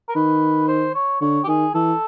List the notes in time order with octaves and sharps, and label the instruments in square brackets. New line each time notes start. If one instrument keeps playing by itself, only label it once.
[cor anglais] A#4
[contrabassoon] D#3 [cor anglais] B4
[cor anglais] C5
C#5
[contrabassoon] D3 [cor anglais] C#5
[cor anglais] G4
[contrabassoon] D#3 [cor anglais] G#4
[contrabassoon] E3 [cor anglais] A4